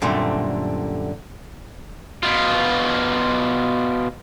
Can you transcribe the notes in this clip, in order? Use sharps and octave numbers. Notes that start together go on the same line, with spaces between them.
F#2 A#2 D3 G3 A3 C4
B2 F4